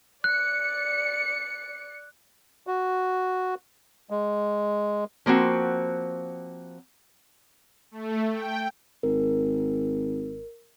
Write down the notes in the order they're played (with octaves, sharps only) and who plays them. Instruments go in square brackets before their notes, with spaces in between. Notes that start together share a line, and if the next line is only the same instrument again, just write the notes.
[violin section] D5 C#7 [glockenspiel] F#6
[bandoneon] F#4
G#3
[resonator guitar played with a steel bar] F3 A#3 C4 F#4
[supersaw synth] A3
G5
[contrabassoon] G#1 [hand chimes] A#4